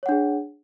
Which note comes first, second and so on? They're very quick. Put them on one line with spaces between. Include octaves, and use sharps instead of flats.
C#5 F#5 D4 G#4